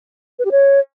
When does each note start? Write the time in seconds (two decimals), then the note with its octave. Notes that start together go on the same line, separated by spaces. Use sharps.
0.39 B4
0.45 G4
0.51 C#5